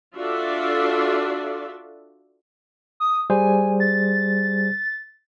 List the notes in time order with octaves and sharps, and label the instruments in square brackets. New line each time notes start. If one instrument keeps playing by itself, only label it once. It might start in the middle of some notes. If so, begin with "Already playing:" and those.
[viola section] D4 F4 F#4 A4 D5 E5
[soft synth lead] D#6
[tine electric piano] G3 G#4 C5 [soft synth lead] G#5
[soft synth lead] A6